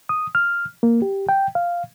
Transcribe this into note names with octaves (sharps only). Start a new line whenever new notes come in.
D#6
F6
A#3
G4
G5
F5